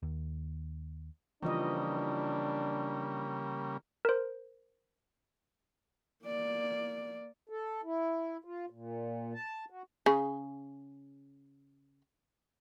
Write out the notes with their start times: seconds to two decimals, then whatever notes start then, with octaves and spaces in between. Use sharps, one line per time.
0.03 D#2
1.43 C#3 E3 F3 G3 A#3 D4 D#5
4.05 A#4 C5
6.25 A#3 D5
7.49 A4
7.84 E4
8.44 F4
8.70 A#2
9.34 A5
9.70 F#4
10.06 C#3 G#4